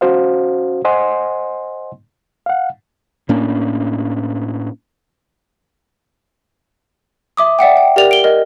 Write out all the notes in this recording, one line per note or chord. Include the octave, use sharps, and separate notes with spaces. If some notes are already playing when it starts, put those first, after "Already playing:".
C#4 F#4 C5 F5
C5 D#5 F#5 G#5 C6
F5 F#5
A2 A#3 C#4 D4
E5 D6 D#6
D5 E5 F#5 G5
G5
G4 A#4 D5 F7
D7 G7
A#4 D#5